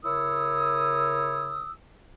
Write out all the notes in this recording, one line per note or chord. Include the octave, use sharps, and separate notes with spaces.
C#3 E4 A#4 C#5 D#6 E6